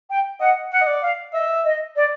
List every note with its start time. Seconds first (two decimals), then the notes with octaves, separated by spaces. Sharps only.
0.10 G5
0.40 D#5 F#5
0.71 F#5
0.81 D#5
0.87 D5
1.02 F5
1.34 D#5 E5
1.65 D#5
1.95 D5